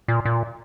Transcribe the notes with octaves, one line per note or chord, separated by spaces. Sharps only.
A#2
A#2